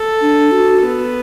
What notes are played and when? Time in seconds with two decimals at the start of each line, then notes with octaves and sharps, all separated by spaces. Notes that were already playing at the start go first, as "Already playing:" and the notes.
Already playing: A4
0.21 D4
0.51 F#4
0.82 B3